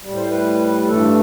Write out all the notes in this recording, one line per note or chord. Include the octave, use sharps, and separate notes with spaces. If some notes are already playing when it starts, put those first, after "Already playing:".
A2 G3
C5
B4
G2 E3 A3 A4